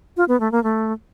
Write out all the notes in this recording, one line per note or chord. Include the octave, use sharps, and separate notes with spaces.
F4
B3
A3
A#3
A3